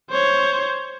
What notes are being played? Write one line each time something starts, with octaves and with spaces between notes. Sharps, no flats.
C5 C#5